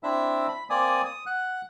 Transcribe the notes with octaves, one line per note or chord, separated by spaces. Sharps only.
C4 D4 E4 E5 E6
B5
A#3 C4 D5 G#5 D#6
D#6
F#5 F#6